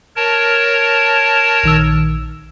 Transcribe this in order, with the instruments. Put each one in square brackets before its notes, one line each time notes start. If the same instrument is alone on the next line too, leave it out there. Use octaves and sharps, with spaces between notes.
[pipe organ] A#4 C#5 A5
[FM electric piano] A#1 D#3 E6